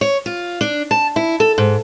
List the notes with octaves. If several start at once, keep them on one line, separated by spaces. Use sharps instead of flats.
C#5
F4
D4
A5
E4
A4
G#2